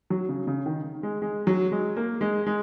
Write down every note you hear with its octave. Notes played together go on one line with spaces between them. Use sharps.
F#3
C#3
C#3
D#3
G#3
G#3
F#3
G#3
A#3
G#3
G#3